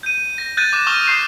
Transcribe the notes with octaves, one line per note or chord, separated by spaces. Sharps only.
G6 D#7
A#6
F#6 G6 A6 D#7
D6 F#6 A6 E7
C#6 D#6 F6
C#6 D#6 G6 C7